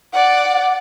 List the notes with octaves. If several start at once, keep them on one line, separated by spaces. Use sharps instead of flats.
D5 F#5